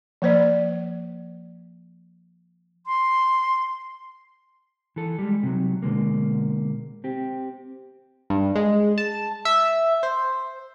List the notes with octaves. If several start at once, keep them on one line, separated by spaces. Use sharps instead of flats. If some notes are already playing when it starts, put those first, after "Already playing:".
F3 A#3 C5 D5
C6
E3 A4
G3 G#3
C3 F#3
B2 D3 G#3 A#3
C4 G4
G2
G#3
A5
E5
C5